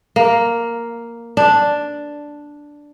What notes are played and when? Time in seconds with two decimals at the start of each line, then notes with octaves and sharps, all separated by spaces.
0.16 A#3
1.37 D4